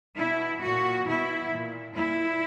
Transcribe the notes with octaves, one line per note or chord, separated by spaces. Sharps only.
B2 E4
A#2 F#4
B2 E4
A#2
A#2 E4